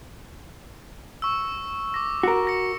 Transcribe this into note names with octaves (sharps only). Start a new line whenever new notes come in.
C#6 E6
D6 A#6
F#4 A#4
A#6 C#7